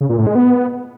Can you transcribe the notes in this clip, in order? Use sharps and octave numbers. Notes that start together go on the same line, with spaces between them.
C#3
A#2
A2
G#3
B3